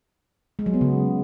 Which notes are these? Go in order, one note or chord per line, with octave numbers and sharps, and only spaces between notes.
G#3
F#3
B3
C#3